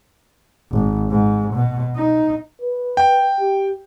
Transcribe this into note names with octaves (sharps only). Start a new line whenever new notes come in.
G#1
G#2
B2
D#4
B4
G5
G4